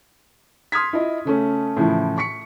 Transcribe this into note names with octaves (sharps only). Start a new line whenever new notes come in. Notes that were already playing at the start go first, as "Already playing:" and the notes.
C6 D#6 F6 G#6 B6
E4 F4 D#5
C#3 A3 C#4
A2 C#3 E3 F3 E4
C#6 B6 C#7